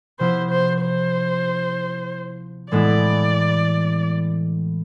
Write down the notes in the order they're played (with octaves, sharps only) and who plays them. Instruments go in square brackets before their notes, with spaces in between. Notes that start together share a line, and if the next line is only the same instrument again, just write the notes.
[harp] C3 F3 B3 E4 [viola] C5
[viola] C5
C5
[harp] A2 E3 G#3 B3 E4 [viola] D5